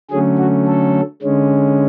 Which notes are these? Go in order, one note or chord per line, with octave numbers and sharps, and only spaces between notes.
D3 F#3 A3 C#4 G#4
F#4
A4
D3 G#3 C#4